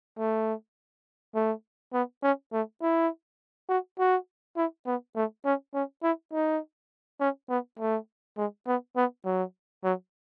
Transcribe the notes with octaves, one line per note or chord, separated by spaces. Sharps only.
A3
A3
B3
C#4
A3
E4
F#4
F#4
E4
B3
A3
C#4
C#4
E4
D#4
C#4
B3
A3
G#3
B3
B3
F#3
F#3